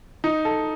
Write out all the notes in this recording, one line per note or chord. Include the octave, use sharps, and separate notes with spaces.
D#4
A4